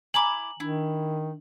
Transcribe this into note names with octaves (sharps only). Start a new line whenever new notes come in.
E4 G#5 A#5 B5 D6 F#7
D#3 D4 E4